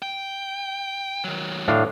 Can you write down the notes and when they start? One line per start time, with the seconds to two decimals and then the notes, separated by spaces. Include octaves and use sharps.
0.02 G5
1.24 D#3 F#3
1.68 A2 D4 F5